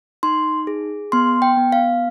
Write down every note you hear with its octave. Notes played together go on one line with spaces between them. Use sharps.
D#4 C6
G#4
B3 C6
G5
B3
F5